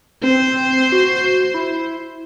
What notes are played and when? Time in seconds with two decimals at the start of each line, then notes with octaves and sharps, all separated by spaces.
0.23 C4 C5
0.92 F#4
1.54 E4